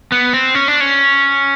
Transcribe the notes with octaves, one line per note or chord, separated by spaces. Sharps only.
B3
C4
C#4
D4
C#4